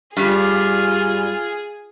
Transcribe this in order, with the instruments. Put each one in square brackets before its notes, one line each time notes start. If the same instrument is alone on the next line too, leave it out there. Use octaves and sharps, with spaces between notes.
[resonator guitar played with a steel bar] G2 G3 [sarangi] F4 [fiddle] G#4